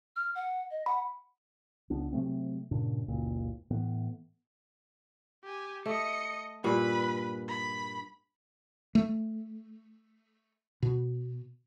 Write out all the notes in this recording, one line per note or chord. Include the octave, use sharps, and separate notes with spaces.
F6
F#5
D#5
F#5 B5
C#2 B3 D4
C3 F#3 A3 C4
G2 A#2 C#3 D4
F#1 C#2 A#2
A2 E3 B3
G4 G#5
A3 D#5 C#7
G2 A#2 B4 B5
B5
A3
B2